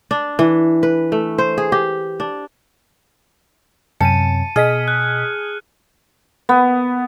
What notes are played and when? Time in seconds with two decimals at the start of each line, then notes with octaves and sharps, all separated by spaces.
0.11 D4
0.39 E3
0.83 B4
1.12 A3
1.38 C5
1.58 G#4
1.72 G4
2.20 D4
4.00 F#2 C3 G#5 A5 C#7 D#7
4.56 B2 G#4 D#5 F6 B6
4.88 F#6
6.49 B3